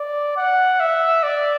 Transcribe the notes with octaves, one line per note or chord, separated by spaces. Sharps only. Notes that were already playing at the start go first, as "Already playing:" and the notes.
Already playing: D5
F#5
E5
D5